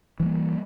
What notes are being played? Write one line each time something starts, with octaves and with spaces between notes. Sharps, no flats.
E3 G3 A#3